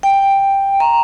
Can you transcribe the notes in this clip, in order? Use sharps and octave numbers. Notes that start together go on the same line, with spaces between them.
G5
A#5